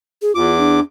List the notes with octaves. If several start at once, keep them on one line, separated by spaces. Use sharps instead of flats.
G#4
E2 F4 D6
D4